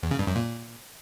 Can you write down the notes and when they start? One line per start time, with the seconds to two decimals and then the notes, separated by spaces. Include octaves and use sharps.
0.03 E2
0.11 C#3
0.19 G2
0.27 F#2
0.36 A#2